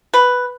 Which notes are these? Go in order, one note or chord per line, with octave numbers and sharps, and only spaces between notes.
B4